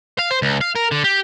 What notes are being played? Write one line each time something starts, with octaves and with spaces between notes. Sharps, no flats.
F5
C5
C#2
F5
A#4
D3
G4